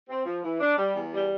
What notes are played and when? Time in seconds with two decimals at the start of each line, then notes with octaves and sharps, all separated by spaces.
0.08 C4
0.25 F3
0.43 E3
0.60 D4
0.77 G3
0.95 E2
1.12 G3